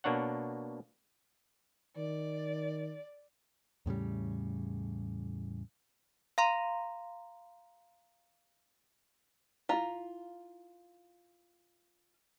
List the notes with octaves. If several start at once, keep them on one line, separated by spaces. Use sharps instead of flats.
B2 A#3 D4 C#5 F#5
D#3 D5
E2 A2 C#3 G3
F5 A#5 C6
E4 F4 F5 A#5